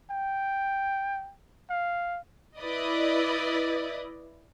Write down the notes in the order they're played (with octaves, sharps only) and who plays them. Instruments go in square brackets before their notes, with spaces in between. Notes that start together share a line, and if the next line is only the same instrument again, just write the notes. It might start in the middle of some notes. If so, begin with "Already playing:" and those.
[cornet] G5
F5
[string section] E4 B4 D5 D#5